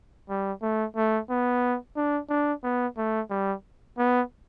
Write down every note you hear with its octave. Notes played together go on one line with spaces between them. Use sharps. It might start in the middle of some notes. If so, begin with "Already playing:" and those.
G3
A3
A3
B3
D4
D4
B3
A3
G3
B3